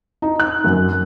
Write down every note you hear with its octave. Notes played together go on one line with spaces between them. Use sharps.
D#4
F#6
F#2